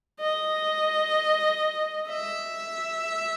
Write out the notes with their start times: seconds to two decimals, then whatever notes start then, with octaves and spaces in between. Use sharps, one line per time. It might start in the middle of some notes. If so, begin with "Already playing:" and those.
0.20 D#5
2.10 E5